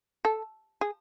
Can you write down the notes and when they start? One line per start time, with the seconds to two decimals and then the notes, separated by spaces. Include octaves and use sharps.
0.25 A4
0.81 G#4